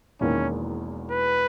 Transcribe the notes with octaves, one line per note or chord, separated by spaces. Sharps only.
E1 E2 D#3 A#3 C#4
B4